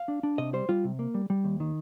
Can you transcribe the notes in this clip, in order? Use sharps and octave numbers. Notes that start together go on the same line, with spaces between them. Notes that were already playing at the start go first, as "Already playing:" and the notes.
Already playing: F5
D4
D4
C3 D#5
G3 C5
G3 F4
C3
A#3
G3
G3
D#2
D#3